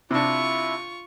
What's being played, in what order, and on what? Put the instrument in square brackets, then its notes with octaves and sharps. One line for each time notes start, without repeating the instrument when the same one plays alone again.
[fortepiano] C3 D4 [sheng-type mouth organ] E4 [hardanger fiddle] F4 C#6